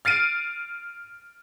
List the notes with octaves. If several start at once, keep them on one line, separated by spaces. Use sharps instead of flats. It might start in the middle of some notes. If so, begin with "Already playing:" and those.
F6 A6 C7 D7 D#7